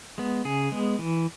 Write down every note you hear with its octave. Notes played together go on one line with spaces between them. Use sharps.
G#3 B3
C#3 G#4
G#3 B3
E3